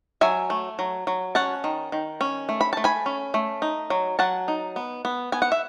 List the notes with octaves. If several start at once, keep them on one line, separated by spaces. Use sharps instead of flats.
F#3 E5 G#5
A3
F#3
F#3
C#4 F#5 A5
D#3
D#3
C#4
A3
B5
A3 A5
G#5 B5
C#4
A3
D#4
F#3
F#3 F#5 A5
D#4
B3
B3
B3 G#5
F#5
E5